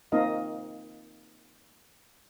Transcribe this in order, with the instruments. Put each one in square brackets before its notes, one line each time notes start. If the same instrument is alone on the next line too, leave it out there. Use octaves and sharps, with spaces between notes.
[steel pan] A#3 C4 D#4 F4 D#5 F5